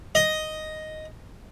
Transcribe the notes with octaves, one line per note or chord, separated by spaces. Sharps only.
D#5